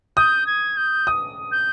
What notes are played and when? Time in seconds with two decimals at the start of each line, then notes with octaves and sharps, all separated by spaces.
0.17 D#6 G6
0.47 G#6
0.77 G6
1.07 D#6
1.52 G6